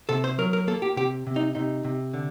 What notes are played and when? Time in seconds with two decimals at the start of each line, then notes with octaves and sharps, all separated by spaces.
0.09 C3 A4
0.24 C5
0.38 F#3 A#4
0.53 A#4
0.67 A#3 A4
0.82 G4
0.96 C3 G4
1.27 C3
1.36 D#4
1.55 C3 D#4
1.84 C3
2.14 D3